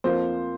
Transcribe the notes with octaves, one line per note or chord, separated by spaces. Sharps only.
F2 F3 A#3 C5